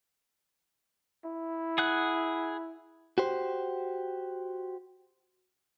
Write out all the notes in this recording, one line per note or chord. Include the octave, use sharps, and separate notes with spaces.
E4
G#4 F#5 F#6
F#4 G4 C5